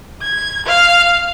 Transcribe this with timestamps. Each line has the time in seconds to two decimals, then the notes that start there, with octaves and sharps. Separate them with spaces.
0.22 G#6
0.66 F5